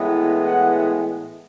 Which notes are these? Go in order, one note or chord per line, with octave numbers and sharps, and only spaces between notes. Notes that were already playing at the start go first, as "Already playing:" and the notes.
Already playing: A2 E3 G#3 B3
F#5